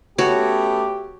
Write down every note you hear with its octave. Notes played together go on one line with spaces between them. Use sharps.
A3 B3 C#4 F#4 G4 C#5